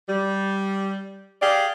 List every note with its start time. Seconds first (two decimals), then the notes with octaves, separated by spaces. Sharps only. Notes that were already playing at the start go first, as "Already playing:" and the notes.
0.09 G3
1.42 G4 G#4 D5 F5